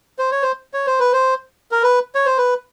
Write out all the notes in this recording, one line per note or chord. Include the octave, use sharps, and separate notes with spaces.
C5
C#5
C5
C#5
C5
B4
C5
A#4
B4
C#5
C5
B4